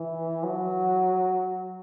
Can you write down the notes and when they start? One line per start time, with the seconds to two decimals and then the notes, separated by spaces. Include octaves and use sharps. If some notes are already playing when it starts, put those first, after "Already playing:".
Already playing: E3
0.43 F#3